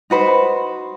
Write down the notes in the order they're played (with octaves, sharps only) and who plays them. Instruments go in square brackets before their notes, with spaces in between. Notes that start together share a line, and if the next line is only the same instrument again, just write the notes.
[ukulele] D#4 F#4 B4 C5